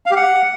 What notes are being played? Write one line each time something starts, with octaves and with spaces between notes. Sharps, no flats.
F5
G4
F#5